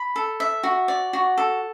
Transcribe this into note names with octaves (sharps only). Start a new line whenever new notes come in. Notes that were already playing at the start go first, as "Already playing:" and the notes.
Already playing: B5
A4
E5
F#4
D5
F#4
A4